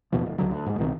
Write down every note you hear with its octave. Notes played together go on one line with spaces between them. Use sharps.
D#2 B2 F3
D1
C#2 D3 F#3
D2
G#2 G#3
C2 B2 D#3 C4